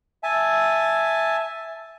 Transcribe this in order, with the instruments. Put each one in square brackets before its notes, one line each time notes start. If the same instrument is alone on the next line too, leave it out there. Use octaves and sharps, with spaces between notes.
[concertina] E5 G#5 A5